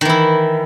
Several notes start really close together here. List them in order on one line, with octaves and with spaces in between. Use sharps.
D#3 E3 E4